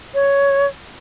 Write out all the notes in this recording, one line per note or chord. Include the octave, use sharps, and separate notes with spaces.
C#5